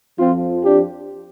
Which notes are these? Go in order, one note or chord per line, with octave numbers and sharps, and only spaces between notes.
F2 F3 C4 F4
D4 G4